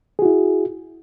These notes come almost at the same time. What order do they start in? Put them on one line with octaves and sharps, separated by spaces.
G#4 F#4 E4